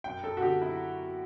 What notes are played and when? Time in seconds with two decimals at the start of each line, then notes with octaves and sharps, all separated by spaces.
0.04 F#2 G5
0.23 F#2 A4
0.37 F#4
0.42 D3 G4
0.62 F#3 E4